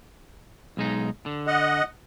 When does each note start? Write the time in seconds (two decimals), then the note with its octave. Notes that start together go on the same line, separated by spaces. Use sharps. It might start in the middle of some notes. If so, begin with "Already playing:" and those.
0.77 B1 G#3 D#4
1.26 D3
1.47 D#5 F#5